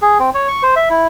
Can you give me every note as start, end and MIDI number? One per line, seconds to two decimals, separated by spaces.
0.02 0.18 68
0.19 0.30 60
0.34 0.47 73
0.48 0.63 85
0.63 0.75 72
0.76 0.89 76
0.90 1.07 64